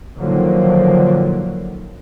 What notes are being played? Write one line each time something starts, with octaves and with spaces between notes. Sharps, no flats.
A#2 D3 D#3 F3 F#3 A#3